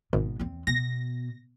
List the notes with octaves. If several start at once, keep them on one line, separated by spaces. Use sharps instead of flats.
G#1 B2
E2 C4
B2 A#6